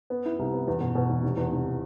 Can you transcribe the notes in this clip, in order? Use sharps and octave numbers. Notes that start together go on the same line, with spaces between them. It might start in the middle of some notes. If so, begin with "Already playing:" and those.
B3
E4
C2
B3
E2
B2
B2
E2
F1
E2
F1